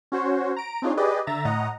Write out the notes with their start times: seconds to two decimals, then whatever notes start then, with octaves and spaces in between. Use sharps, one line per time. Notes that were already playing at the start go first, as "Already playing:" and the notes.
0.12 C#4 F#4 C5 C#5
0.56 A#5 D7
0.82 C4 D4 D#4 F4 G#4 C#5
0.97 G4 G#4 B4 D5 D#5
1.27 D3 E5 A#5 A6
1.45 A2 D#5 F#5 A#5